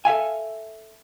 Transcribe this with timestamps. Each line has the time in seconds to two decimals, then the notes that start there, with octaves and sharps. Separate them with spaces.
0.05 A4 E5 F5 G#5